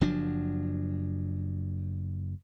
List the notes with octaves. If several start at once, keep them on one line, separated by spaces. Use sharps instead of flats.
F#1 F3 F#3 D4